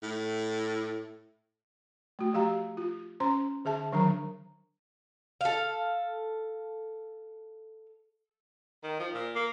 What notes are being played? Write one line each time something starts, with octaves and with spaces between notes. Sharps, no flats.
A2
A3 F#4
F3 A3 G4 F5 A#5
F4
C#4 C5 A#5 C6
D3 G#4 E5 A5
D3 D#3 F#3 D4 A#4 A#5
A4 F5
D#3
F3
A#2
A#3